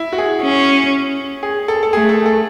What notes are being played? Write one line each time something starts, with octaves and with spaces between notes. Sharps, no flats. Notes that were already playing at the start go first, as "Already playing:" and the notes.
Already playing: E4
F#4
G#4
C#4
G#4
A4
A4
A3 G#4
A4
A4